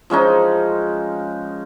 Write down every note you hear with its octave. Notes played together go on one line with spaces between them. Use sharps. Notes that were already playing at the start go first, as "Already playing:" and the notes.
F3 G#3 C#4 D#4